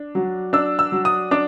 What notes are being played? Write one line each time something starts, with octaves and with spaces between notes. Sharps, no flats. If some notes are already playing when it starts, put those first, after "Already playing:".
Already playing: D4
F#3
D4 E6
E6
F#3
D#6
D4 D6